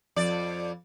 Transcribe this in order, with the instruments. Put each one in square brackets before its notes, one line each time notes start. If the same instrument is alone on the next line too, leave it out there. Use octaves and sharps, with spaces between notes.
[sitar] F2 D5